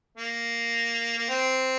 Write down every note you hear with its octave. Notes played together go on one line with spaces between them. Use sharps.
A#3
A#3
C4